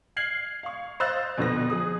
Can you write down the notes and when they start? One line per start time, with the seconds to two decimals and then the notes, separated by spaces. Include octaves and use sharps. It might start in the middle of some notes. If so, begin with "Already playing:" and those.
0.16 F6 G#6 C7 F#7
0.63 F5 C#6
1.00 C5 D#5 F5 E6 F#6 A6
1.38 F2 B2 D3 B3 F#6 A#6
1.70 F3 G#4 D#6